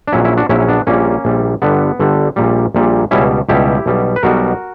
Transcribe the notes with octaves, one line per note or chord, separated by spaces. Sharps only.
D4
A#1 A#2 F#3 C#4 E4
C#4 E4
D4 F#4
A#1 A#2 F#3 C#4 E4
C#4
B3 D4
A#1 A#2 G3 A#3 C#4
A#1 A#2 G3
G1 G2 D3 G3 B3
G1 G2 D3 G3
A#1 A#2 G3
A#1 A#2 G3
C#2 B2 G3 C#4 E4
C#2 B2 G3 E4 G4
B1 B2 G3
B4
B1 B2 G3 F#4 A#4